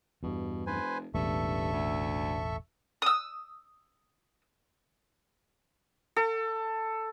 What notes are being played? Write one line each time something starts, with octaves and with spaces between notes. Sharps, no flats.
E2 G2 B2
F1 B4 C5 G#5
E1 A1 E2 G2 A4 E5 C#6
D2
D#6 E6
A4